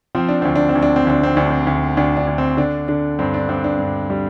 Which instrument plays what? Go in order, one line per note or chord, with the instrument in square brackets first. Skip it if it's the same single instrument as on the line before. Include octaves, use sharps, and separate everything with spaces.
[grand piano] F3 C4
D4
D2 C4
D4
C4
D2
D4
C4
D2 D4
C4
D2 D4
C4
D2
D2 D4
D4
D2
C4
D3 D4
D3 D4
G2 C4
D4
G2 C4
D4
G2
G3